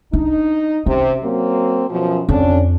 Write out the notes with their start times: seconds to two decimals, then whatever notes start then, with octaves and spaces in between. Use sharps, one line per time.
0.13 D4 D#4
0.86 C3 C#4
1.24 F#3 A#3 C4
1.90 F#2 B2 F3
2.29 F2 D3 C#4 D4